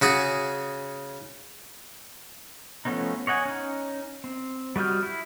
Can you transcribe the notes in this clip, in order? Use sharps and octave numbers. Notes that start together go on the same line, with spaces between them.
C#3 F#4 G#4
F3 A3 B3 C#4 D#4
C#5 D#5 F#5 G#5
C#4 D#4
C4
G3 F#4 D#5 F6 G6
E4